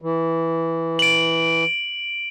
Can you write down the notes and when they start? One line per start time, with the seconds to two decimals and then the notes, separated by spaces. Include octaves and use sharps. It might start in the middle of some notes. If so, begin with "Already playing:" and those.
0.02 E3
0.99 D7 F#7